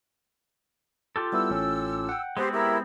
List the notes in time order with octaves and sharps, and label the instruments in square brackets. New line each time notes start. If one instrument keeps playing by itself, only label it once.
[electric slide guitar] F4 G4 A4
[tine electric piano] G3 B3 E4 [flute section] E6
[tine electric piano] A1 A2 C#4
F#5 G5
[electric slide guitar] G#3 B3 C4 [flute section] G4 C5
[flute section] E4 A#4 E6 [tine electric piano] G4